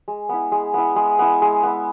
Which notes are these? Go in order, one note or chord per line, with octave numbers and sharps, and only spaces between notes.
G#3
B3 E4
G#3
B3 E4
G#3
B3 E4
G#3
B3 E4